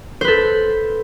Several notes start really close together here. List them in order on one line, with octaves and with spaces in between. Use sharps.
C5 B4 A4